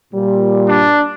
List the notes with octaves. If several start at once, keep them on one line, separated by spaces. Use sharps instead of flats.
A#2 G3
D4